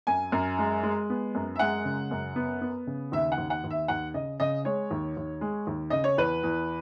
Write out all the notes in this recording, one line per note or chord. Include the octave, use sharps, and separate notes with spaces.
F#2 G#5
F#2
G#3
G#3
B3
F#2
E5
G#3 F#5
C#3
F#2
B3
B3
C#3
D#2 E5
F#5
D#2
F#5
D#2
E5
D#2 F#5
C#3 D#5
C#3 D#5
G#3 C#5
D#2
D#2
G#3
D#2
C#3 D#5
C#5
E2 B4
E2